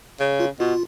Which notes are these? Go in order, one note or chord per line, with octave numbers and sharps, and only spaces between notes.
C#3
F4
B2 F4